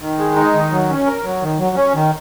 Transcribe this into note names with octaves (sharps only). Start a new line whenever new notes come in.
D#3
G#3
D#4
D#3
F#3
C#4
A#4
F#3
D#3
F#3
C#4
D#3